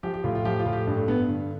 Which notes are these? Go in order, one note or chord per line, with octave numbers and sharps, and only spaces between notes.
F3 G4
G4
A2 F4
F4
F3 G4
F4
A2
G4
G2 G4
A3
G2 B3
D3